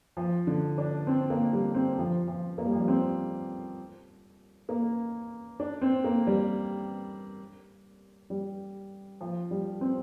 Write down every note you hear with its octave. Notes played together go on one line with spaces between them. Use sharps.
F3
D3
D4
C4
A#3
G3
C4
F3
F3
A#3
G3
F3
G3
C4
A#3
D4
C4
A#3
G3
G3
F3
G3
C4